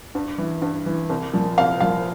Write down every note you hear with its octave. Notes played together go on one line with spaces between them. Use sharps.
G2
E3
G2
E3
C2
A#2 F3
C2 F5
A#2 F3 F5